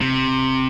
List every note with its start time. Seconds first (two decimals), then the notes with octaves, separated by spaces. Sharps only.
0.01 C3